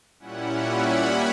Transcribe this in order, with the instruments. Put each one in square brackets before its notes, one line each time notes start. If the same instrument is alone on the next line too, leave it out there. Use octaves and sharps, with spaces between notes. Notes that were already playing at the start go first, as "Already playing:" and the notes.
[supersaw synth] A#2 G3 C#4 E4 F#5
B5
B5